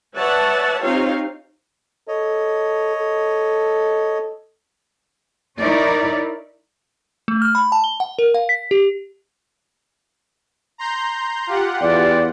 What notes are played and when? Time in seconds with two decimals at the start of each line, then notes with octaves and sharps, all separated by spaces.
0.17 B4 C#5 D5 E5 F#5 A5
0.83 C4 D#4 F4 G4 C#5 F5
2.08 A4 C#5 D#5
2.96 A4
5.59 D#4 E4 A#4 C#5 D5
7.28 A3
7.42 F6
7.55 B5
7.72 A5
7.84 G7
8.00 F#5
8.19 A#4
8.34 F5
8.49 B6
8.71 G4
10.78 A#5 C6 G6
11.47 F4 G4 F#5
11.81 E2 D5